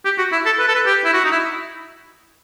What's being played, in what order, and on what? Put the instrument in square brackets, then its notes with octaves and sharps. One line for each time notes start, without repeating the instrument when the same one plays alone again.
[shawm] G4
F#4
E4
A4
B4
A4
B4
G4
E4
F#4
D#4
E4